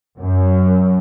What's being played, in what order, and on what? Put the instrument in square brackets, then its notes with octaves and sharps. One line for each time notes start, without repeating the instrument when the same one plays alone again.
[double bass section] F#2